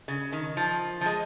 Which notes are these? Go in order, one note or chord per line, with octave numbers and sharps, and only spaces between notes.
C#3
D#3
F3
F3
G#3